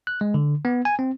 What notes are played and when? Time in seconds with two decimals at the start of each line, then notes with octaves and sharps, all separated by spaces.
0.07 F#6
0.21 G#3
0.34 D3
0.65 B3
0.85 G#5
0.99 C4